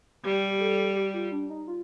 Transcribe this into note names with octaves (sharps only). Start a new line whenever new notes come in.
G3 G4
A4
G4
F4
D4
D#4
F4